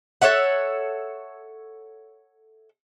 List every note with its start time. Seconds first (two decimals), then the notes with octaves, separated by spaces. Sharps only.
0.21 A4 C#5 E5 F#5